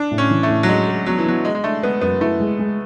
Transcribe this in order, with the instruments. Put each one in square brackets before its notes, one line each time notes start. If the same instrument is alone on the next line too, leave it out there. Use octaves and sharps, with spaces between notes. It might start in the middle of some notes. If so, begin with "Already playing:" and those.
Already playing: [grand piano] D4
[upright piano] A2
[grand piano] C#4
[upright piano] E3
[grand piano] A3
[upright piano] A2
[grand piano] F#3
[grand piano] G#3 [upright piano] D4
[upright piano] F#4
[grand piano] F#3 [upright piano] B3
[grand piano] E3
[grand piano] F#3 [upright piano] B3
[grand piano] G#3 [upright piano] D4
[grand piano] G#3
[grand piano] A3 [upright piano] D4
[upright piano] G#3 [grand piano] B3
[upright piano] F#2 [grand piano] B3
[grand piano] A3 [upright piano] E4
[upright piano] G#3
G#3